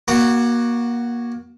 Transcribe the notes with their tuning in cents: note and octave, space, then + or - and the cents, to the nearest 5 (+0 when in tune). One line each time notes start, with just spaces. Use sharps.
A#3 +25 F#4 +5 A#5 -35